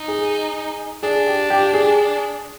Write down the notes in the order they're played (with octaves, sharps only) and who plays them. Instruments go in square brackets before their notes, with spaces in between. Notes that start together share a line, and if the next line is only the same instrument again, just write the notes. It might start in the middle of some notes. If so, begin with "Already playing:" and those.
Already playing: [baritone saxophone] D#4
[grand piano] G#4
[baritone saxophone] D4 [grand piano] G#4
[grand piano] G4
G4
G#4